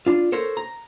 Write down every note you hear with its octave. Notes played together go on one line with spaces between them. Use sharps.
D4 F4
A4 A#4 C5 C#5
A#5